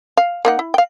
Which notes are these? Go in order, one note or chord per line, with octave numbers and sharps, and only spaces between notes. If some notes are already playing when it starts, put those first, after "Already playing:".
F5
A#3 D#4 F#5
E4
F5 G5